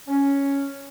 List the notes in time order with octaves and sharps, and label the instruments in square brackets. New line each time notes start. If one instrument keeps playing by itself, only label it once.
[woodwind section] C#4